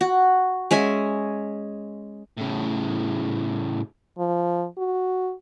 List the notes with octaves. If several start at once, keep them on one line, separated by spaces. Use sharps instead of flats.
F#4
G#3 C#4 E5 G#5
A2 C#3
F3
F#4